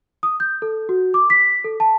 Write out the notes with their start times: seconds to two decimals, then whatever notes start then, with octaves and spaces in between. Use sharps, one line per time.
0.23 D#6
0.40 G6
0.62 A4
0.89 F#4
1.14 D6
1.30 B6
1.64 A4
1.80 A5